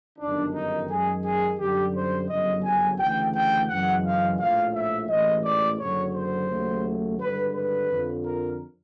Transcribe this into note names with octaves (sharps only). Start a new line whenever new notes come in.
G1 F#2 D#3 D4
D#4
F#2 D#3 G#3 G#4
G#4
F#2 D3 G3 G4
C5
G1 F#2 C#3 F#3 D#5
G#5
D2 C#3 E3 G5
G5
F#2 C#3 E3 G#3 F#5
F5
A#1 A2 F3 F5
E5
A1 G#2 E3 D#5
D5
F#1 F#2 D3 F#3 C#5
C5
D#2 C#3 F#3 A3
G#1 G2 D3 G3 B4
B4
F2 D3 F3
A#4